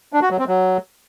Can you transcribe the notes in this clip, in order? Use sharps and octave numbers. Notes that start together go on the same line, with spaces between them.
D4
F#4
F#3
C4
F#3